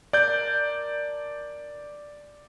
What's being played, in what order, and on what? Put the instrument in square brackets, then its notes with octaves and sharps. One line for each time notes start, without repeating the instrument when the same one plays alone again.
[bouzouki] D4 A#4 [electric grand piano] D5 G6